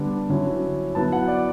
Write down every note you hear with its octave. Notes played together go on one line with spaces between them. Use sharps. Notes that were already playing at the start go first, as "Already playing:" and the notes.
Already playing: D3 G3 B3 D4
D3 F#3 C#4 E4
F#3 B3 E4 A5
F#5
D5